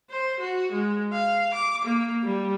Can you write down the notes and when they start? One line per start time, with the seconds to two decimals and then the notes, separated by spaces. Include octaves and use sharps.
0.10 C5
0.40 F#4
0.72 G#3
1.12 F5
1.54 D6
1.84 A#3
2.24 G3